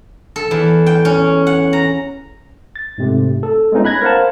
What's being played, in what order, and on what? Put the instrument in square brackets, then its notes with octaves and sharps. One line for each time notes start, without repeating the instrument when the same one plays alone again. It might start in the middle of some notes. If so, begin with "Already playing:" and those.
[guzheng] A4
E2
G5
C#4
F#5
A#5
[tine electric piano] A6
G#2 C3 A3
A4
G#3 A3 B3 C#4 D#4 F4
B5 F#6 G#6 A#6
A#4 C5 F5 F#5 A5